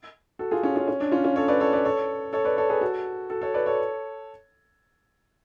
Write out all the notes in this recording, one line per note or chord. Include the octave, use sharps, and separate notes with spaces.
F#4 A4
F4 G#4
C#4 F4
C#4 F4
C#4
D4
C#4 F4
C#4 F4
A4 C#5
B4 D5
A4 C#5
B4 D5
A4 C#5
A4 C#5
B4 D5
A4 C#5
G#4 B4
F#4 A4
F#4 A4
A4 C#5
B4 D5
A4 C#5